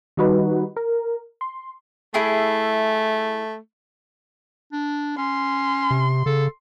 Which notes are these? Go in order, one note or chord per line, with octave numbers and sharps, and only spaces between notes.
D#3 G3 D#4 F#4 B4
A#4
C6
A3 E4 G#4
D4
C#4 C6
C3
C#3 A4